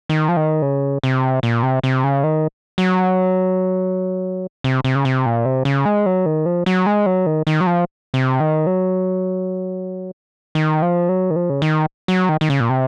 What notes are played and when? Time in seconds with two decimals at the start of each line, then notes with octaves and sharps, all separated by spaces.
0.09 D#3
0.29 F3
0.37 D#3
0.62 C#3
1.03 C3
1.43 A#2
1.63 C3
1.83 C3
2.04 C#3
2.23 D#3
2.78 F#3
4.64 C3
4.84 C3
4.95 C#3
5.05 C3
5.26 A#2
5.45 C3
5.65 C#3
5.85 G#3
6.06 F#3
6.26 D#3
6.46 F3
6.66 F#3
6.86 G#3
7.06 F#3
7.26 D#3
7.47 D#3
7.61 F#3
7.67 F3
8.14 C3
8.40 D#3
8.67 F#3
10.55 D#3
10.82 F3
11.09 F#3
11.30 D#3
11.36 F3
11.50 C#3
11.62 D#3
12.08 F#3
12.29 D#3
12.41 D#3
12.50 C#3
12.60 A#2
12.70 C3